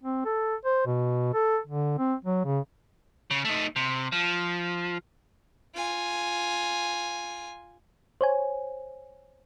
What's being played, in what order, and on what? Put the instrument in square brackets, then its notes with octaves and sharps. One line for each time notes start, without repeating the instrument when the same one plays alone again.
[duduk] C4
A4
C5
B2
A4
D3
C4
F#3
C#3
[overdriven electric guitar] C#3
A3 D#4
C3
F3
[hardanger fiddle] F4 G#5
[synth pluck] C5 C#5 G#5